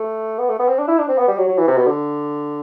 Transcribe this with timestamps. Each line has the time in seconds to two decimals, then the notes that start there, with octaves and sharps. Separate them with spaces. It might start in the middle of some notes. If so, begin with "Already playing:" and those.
Already playing: A3
0.39 B3
0.49 A3
0.59 B3
0.68 C4
0.79 D4
0.88 E4
0.98 D4
1.08 C4
1.18 B3
1.28 G3
1.38 F#3
1.48 F#3
1.58 E3
1.67 C3
1.77 B2
1.87 D3